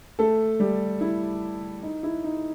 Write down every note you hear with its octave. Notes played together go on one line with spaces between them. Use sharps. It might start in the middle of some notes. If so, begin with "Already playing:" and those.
A3 A4
G3 G4
E4
D#4
E4
D#4